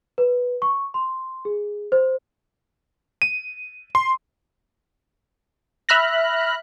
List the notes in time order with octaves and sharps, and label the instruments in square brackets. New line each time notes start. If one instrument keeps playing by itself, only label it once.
[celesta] B4
C#6
C6
G#4
C5
[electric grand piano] D#7
C6
[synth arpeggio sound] E5 B5 F6 F#6 A#6